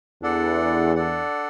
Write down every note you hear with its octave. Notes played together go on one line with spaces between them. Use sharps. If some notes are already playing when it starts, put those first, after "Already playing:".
E2 D4 A4 D5 F#5
D4 A4 D5 F#5